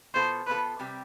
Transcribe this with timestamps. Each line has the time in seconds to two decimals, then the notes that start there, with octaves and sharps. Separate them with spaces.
0.14 B2 B3 F4 A4 C5
0.47 B2 B3 F4 A4 B4
0.79 C3 G3 C4 G4